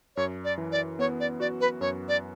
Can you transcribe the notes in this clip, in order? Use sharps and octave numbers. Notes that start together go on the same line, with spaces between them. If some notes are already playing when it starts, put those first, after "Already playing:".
F#2 C#5
D5
E3
D5
B3 C#5
D5
F#4 D5
B4
F#2 C#5
D5